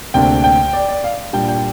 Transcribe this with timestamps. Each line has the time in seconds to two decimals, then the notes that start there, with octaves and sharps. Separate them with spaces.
0.14 D2 C3 A#3 D4 G5
0.44 G5
0.73 D5
0.89 D5
1.04 F5
1.33 A#2 G3 D4 G5
1.48 G5